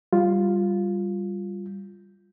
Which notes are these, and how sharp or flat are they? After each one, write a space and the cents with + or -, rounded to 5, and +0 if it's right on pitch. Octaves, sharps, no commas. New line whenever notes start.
G3 +0 F4 +0